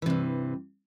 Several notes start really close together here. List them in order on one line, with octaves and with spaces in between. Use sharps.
E3 C3 G2